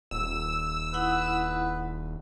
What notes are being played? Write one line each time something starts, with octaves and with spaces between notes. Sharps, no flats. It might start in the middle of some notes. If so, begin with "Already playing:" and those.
D#1 E6
E4 B4 F#5 D#6